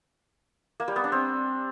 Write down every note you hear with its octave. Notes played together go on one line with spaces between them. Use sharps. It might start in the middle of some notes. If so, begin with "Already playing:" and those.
A#3
G3
B3
D4
C4